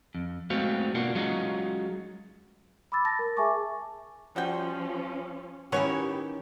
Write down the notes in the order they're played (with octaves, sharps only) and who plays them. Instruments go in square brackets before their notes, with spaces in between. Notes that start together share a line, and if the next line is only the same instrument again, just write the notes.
[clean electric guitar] F2
G#3 A3 B3 C4 F#4 F5
B2 A#3 D4 F4 F#4
F#3 G#3 C#4 D#4 F4 F#4
[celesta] B5 D6 E6 A6
A5 A6 A#6
A#4
G#4 E5 G#5 A5 C#6 D6
[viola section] F3 C#4 [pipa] G3 F#4 G5
[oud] D#3 C#4 E4 [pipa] B3 C#5 [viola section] G4